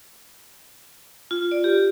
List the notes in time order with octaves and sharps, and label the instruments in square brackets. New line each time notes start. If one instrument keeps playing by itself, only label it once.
[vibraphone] F4
D5
G4